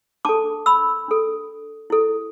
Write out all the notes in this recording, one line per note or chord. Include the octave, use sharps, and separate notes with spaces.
D4 A4 A5 D6
B5 E6
D4 A4
E4 A4